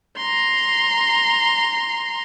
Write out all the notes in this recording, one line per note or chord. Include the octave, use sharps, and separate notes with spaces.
A#5 C6